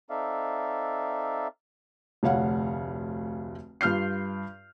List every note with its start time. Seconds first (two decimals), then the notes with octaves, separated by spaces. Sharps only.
0.10 C4 D#4 A4 D5 E5 F5
2.23 F1 D2 C#5 F5 F#5
3.81 G2 F4 F6 G6 C7